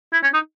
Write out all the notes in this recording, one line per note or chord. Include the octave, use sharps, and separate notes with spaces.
E4
C#4
D#4